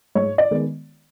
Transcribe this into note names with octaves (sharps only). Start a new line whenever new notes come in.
G#2 C#5
D5
D#3 G#3 B3